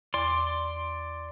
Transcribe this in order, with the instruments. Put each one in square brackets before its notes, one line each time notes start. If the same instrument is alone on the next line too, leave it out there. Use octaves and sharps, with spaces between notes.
[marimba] E2 [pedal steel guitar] D5 C6